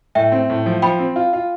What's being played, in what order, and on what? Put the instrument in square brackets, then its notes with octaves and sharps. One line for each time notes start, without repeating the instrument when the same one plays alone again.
[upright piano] A2 [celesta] E5 G5
[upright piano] C4
A2
F3
[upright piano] F3 [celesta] G5 B5
[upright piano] C4
F4
F4